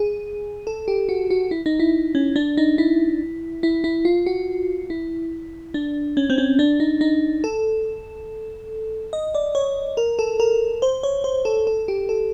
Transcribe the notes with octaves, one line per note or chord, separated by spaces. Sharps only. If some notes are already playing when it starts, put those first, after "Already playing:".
Already playing: G#4
A4
G4
F#4
F#4
E4
D#4
E4
C#4
D4
D#4
E4
E4
E4
F4
F#4
E4
D4
C#4
C4
C#4
D4
D#4
D#4
A4
D#5
D5
C#5
A#4
A4
A#4
C5
C#5
C5
A4
A4
G4
A4